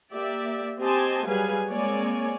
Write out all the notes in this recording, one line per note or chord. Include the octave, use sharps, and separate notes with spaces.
A#3 G4 D5 E5
C4 G4 D#5 G#5 A5 C6
F#3 G3 G#4 B4 F5 G#5
G#3 A#3 C4 C#5 D5 G#5